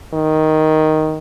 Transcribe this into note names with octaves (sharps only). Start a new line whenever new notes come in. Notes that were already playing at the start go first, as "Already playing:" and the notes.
D#3